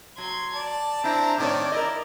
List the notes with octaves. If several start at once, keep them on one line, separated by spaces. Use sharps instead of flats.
F#3 C6 G#6
D5 A5
C4 D4 E4 A#5
A2 D#3 C4 C#5 D5
E4 A#4 D#5